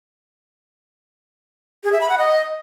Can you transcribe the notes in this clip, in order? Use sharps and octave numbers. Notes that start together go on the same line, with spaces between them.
G#4
E5
B5
F#5
D#5